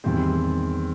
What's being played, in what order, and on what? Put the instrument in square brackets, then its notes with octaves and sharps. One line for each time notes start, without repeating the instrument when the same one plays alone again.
[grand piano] E2 D#3 G3 C4